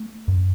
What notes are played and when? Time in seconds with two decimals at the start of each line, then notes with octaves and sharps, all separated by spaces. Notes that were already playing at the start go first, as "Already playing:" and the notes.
Already playing: A3
0.28 F#2